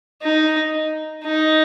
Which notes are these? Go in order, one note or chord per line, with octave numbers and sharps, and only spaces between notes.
D#4
D#4